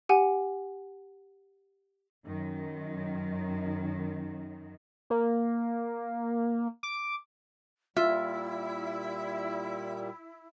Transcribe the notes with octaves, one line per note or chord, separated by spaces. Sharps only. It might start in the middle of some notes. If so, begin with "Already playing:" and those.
G4 F#5 G#5
F#2 D#3
A#3
D6
A#2 G3 E4 F4 E5